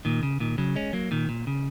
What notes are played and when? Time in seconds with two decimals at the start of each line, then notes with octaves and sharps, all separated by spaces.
0.05 A#2 D#3
0.23 C#3
0.40 A#2 D#3
0.58 C#3 F#3
0.76 G#3 C#4
0.93 F#3 A#3
1.11 A#2 D#3
1.29 A#2
1.47 C#3